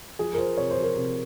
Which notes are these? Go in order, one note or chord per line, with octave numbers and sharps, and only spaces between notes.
F3 G#4
A#4
F3 C5
C3 C#5
C5
F3
A#4
C3